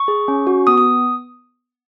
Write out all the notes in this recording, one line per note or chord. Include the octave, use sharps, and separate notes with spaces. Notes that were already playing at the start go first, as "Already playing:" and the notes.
Already playing: C#6
G#4
C#4
F#4
B3 D#6
D#6